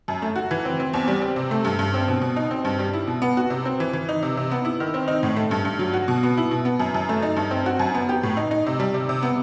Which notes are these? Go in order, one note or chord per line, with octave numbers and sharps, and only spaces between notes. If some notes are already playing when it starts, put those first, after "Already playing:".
F#2
A3
F#4
E3
C4
C4
E2
G3
C4
C3
A3
G2
G2
C4
B2
B2
D#4
C4
G2
G3
E4
B2
B3
F#4
C3
C4
E3
E3
D#4
C3
C3
B3
E4
D#3
C4
D#4
A2
A3
G2
G2
F#3
F#4
B2
B3
E4
B2
B3
F#2
F#2
A3
D#4
G2
C4
F#4
F#2
B3
G4
A2
D#4
D#4
C3
G3
C3
C3
B3